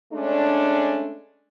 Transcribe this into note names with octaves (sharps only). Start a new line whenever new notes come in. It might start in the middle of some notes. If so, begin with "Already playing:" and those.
G#3 A3 C#4 D4